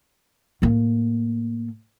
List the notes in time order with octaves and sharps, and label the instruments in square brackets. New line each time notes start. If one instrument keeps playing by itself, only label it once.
[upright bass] A2 A#3